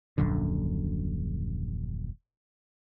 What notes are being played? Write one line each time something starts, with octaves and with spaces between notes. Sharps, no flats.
D#1 A#1 F#2 D3